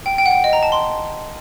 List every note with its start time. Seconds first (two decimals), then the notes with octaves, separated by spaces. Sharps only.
0.06 G5
0.18 G5
0.26 F#5
0.31 G5
0.44 D#5
0.53 A#5
0.63 A5
0.72 C6